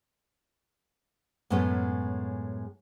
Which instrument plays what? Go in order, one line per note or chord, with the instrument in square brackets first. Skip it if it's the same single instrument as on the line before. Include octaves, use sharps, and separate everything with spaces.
[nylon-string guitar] F#2 A2 G#3 A3 B3 C#4